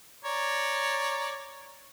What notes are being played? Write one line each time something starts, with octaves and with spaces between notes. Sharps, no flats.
C#5 D5 A#5